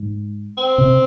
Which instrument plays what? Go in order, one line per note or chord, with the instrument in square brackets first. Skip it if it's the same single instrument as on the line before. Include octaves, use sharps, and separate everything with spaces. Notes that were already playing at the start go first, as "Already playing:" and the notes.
Already playing: [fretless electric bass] G#2
[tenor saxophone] C4
[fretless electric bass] C3